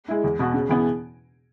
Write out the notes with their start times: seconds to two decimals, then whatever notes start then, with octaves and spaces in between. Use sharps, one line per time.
0.08 G#3 E4
0.24 E2
0.39 B2 B3 F#4
0.54 C#3
0.69 E3 B3 G#4